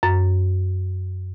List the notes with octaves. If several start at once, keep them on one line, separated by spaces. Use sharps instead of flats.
F#2